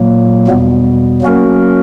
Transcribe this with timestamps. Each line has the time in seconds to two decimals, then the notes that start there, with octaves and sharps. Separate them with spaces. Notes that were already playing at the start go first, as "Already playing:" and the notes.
Already playing: A#2 F#3 A#3
0.48 E2 B2 G3 B3
1.22 F#3 A#3 C#4 F#4 A#4